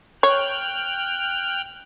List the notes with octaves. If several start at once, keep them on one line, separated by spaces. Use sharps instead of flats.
C#5 G5 F6 F#6